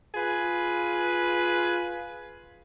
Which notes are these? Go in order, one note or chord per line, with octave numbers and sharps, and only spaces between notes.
F4 G#4 B4